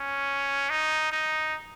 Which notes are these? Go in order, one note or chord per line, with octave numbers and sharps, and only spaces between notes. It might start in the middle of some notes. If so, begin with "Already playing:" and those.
Already playing: C#4
D#4
D#4